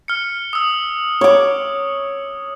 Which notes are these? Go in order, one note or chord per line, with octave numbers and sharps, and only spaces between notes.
F6 C#7
D#6 E6
C#5 D6